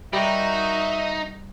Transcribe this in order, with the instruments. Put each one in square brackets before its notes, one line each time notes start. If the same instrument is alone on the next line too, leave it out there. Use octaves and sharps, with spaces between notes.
[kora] G3 [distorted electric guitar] D#4 [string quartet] F#4 A#4 [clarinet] E5